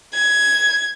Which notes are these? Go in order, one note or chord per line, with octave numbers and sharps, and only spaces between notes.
G#6